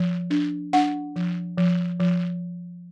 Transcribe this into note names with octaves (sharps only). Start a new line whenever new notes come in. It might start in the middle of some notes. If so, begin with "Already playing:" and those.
Already playing: F3
D4
D4 F#5
F3
F3
F3